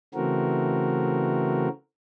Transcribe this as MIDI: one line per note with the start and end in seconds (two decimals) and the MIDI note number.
0.14 1.68 49
0.14 1.68 52
0.14 1.68 57
0.14 1.68 60
0.14 1.68 66
0.14 1.68 70